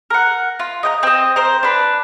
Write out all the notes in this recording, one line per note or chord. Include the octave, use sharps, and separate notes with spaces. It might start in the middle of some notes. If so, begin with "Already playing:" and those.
A#4 F#5
F4
D#5 G5 A#5
C4 D#5
A#4 C5
D4 B4